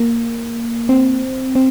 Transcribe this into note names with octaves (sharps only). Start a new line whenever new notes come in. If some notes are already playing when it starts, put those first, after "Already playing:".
Already playing: A#3
C4
C4